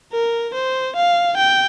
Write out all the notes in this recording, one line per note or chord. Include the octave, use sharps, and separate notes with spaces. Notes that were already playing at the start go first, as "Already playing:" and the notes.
A#4
C5
F5
G5